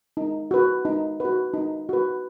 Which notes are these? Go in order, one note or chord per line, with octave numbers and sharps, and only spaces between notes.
D#4
F#4 B4
D#4
F#4 B4
D#4
F#4 B4